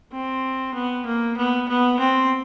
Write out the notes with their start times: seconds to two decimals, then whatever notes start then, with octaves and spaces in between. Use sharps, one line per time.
0.12 C4
0.74 B3
1.06 A#3
1.37 B3
1.69 B3
1.99 C4